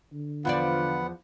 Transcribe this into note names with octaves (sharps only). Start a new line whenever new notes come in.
D3
E2 F3 B3 F4 D5 F#5